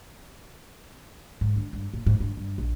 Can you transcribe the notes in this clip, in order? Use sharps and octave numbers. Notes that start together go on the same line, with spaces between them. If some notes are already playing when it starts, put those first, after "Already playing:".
G#2
D3
G2
A#2
G#2
G2
G2
A#1